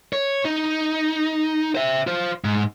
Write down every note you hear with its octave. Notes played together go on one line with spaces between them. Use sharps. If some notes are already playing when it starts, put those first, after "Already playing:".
C#5
D#4
C5 E5
F4 C5
G#2